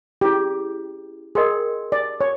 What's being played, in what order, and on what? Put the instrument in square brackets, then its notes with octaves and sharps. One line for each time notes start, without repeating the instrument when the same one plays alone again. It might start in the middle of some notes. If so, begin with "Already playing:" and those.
[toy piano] C#4 E4 G#4 [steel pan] G4
[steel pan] G#4 [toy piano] A#4 D#5 G5 C6
[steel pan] D5
C#5